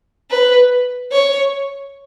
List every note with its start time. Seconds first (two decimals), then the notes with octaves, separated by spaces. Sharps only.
0.31 B4
1.12 C#5